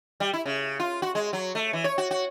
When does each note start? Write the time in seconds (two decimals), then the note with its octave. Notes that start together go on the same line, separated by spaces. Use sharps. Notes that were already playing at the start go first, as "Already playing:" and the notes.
0.20 G3
0.33 E4
0.45 C#3
0.80 F4
1.02 F#4
1.15 G#3
1.33 F#3
1.55 A3
1.73 E3
1.84 C#5
1.98 F#4
2.11 F#4